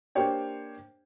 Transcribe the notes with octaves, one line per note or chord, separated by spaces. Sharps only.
A#3 D4 G4 C5 C#5 G5